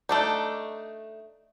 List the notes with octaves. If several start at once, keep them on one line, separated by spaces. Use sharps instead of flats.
A3 D4 D#4